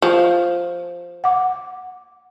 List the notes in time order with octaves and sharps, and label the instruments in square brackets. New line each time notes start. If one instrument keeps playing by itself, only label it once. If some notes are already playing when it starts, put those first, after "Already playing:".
[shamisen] F3
[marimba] F#5 D6